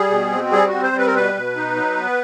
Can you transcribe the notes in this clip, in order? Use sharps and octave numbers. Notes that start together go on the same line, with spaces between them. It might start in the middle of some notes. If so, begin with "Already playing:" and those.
Already playing: G3 G#4
B2
C4
G3 G#4
C4 F#4
C5
G3
B4
A#4
B2 B4
B2
D#4
F#3
B3